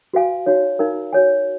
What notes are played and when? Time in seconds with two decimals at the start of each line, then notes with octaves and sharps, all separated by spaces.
0.14 F#4 B4 F5 G#5
0.46 D#4 F#4 C#5
0.79 D#4 A#4 F5 A#5
1.13 F#4 C#5 G#5